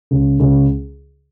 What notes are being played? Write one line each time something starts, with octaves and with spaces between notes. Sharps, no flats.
C#2
C#2